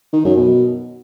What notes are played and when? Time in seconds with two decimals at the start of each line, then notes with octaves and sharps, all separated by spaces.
0.13 D#3
0.25 F#2
0.37 B2